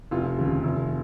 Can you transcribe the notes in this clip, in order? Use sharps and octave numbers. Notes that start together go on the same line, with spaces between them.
F1 F4
D#2 C#3
F1